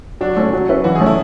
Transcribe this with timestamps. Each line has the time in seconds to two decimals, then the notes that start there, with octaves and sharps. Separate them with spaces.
0.21 F#3 D4
0.37 A3 C#4
0.53 F#3
0.69 C#4 E4 B4 E5
0.84 E3 F#4
0.95 G#4
1.01 A3 C#4
1.06 E4